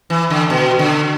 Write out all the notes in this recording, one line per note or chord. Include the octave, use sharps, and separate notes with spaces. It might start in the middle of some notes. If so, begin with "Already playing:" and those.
E3
D3
B2
D3